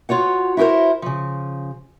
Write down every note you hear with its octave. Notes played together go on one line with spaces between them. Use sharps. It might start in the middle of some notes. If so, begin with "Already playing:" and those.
F4 F#4 C#5 F#5
E4 F#4 G4 A#4 C5
C#3 F3